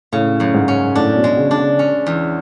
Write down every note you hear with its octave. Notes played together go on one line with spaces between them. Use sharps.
A2 C#3
F#2
G#2
C#4
A2 D4
B2
G#3
C#3
D4
C#3
C#4
E2